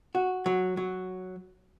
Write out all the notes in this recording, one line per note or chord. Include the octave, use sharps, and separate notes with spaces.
F#4
F#3
F#3